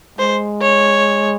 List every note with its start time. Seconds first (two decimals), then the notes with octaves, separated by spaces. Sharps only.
0.18 G#3 C5
0.62 C#5